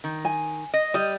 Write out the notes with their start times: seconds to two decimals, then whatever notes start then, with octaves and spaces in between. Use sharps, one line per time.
0.04 D#3
0.25 G#5
0.74 D#5
0.94 G3 D#5